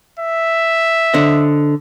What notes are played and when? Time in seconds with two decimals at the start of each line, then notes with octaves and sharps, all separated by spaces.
0.19 E5
1.14 D3 C5 D#5